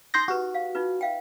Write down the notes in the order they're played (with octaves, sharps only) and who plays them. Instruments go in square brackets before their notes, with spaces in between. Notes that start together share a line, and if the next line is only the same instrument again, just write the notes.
[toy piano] D#4 D#6 [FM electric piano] C6 G6 A#6
[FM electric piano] F#4 [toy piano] G4 B4
[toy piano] F5
D#4 F4 B4
E5 F5 G5